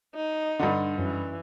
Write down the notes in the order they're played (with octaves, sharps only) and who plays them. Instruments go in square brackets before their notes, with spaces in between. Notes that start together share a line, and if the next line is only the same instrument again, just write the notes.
[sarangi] D#4
[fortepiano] G2 D3 [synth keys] D4
[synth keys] F#2 [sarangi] E3